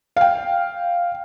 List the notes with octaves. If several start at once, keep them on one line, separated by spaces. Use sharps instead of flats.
F5 G5